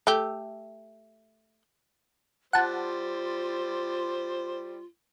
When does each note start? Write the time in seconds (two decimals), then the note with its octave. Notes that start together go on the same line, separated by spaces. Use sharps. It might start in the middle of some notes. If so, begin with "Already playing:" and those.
0.07 A3 G4
2.53 G3 F4 C5 F#5 A5